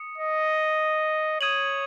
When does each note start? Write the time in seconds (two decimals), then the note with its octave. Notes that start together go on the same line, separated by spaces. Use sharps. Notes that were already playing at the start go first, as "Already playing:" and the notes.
Already playing: D#6 C#7
0.18 D#5
1.41 C#5 D#6 G#6 D#7 F#7